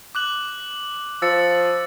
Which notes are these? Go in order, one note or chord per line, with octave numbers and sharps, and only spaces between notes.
D6 F#6 F#7
F3 E6 A6 C#7